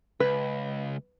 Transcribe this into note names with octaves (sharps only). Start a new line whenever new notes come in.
C#2 B4